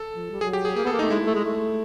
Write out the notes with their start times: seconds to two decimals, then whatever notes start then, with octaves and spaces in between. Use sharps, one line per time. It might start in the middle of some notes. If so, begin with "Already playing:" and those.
Already playing: A4
0.14 F3
0.31 G3
0.41 F#3 G#4
0.53 G4
0.65 G#4
0.76 A#3 G#4
0.84 B3 A4
0.92 A#3
0.99 A3 D#4
1.10 G#3 E4
1.26 A3
1.35 G#3
1.44 A3